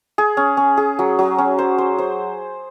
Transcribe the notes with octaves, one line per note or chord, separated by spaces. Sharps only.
G#4
C#4
C#4
G#4
F#3
F#3
C#4
C5
C5
C5